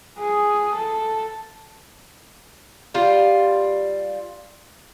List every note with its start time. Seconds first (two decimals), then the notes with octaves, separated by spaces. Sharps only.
0.19 G#4
0.75 A4
2.94 G3 F4